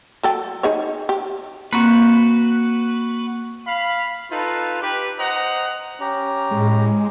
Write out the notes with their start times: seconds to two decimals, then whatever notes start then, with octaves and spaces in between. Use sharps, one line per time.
0.23 F#3 A4 G5
0.63 D#4 G#4 C#5
1.09 G4
1.73 A#3 C4 F#4 B4
3.67 F5 B5
4.30 D#4 F4 A4 B4
4.82 G4 B4
5.18 C5 D#5 F#5 A#5
6.01 C#4 G4 A#5
6.51 A2 G#3